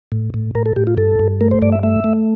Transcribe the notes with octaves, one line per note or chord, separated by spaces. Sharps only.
A2
A2
A2 A#4
A4
A2 G4
F4
G2 A4
G2
A3 A#4
C5
G2 D5
E5
A3 E5
A3